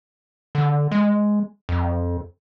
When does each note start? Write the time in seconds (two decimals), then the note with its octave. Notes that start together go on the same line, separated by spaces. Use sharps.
0.55 D3
0.91 G#3
1.69 F2